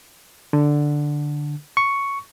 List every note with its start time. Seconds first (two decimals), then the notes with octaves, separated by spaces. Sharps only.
0.53 D3
1.77 C#6